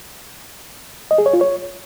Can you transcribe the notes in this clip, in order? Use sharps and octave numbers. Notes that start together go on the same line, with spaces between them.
D#5
G#4
C#5
F4
C#5